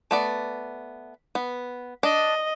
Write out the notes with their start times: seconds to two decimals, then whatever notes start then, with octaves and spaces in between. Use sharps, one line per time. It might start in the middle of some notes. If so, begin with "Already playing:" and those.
0.11 A3 B3 D5
1.35 B3
2.03 D4 D#5